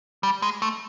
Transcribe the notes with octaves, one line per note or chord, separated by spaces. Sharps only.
G3
G#3
A3